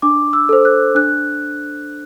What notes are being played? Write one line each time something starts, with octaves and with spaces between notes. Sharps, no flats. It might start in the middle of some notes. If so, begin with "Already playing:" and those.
D4 D6
E6
A4 C5
F#6
D4 F#6